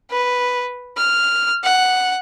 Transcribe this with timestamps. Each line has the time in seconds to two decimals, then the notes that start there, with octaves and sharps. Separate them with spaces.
0.10 B4
0.97 F6
1.63 F#5